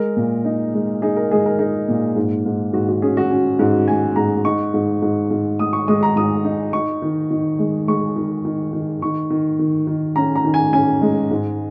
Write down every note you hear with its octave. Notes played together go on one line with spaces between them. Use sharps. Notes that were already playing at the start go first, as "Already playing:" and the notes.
Already playing: G#3 A#4
A#2
D#4
G#3
D#4 G#4
A#4
G#3 G#4
A#4
D#4 G#4
A#2
G#2
G#2
G#2 F#4
F#4
C#4 G#4
F#4
C#4
G#2
G#3 G#5
G#2 A#5
D#4 C#6
G#2
G#2
G#2
G#3 D#6
C#6
G#3 D#6
A#5
G#2 D#6
D#4
D#4 C#6
D#3
D#3
G#3
G#3 C#6
D#3
D#3
D#3
D#3 C#6
D#3
D#3
D#3
C#4 A#5
A#5
D#3
G#5
C#4 G#5
G#3
G#2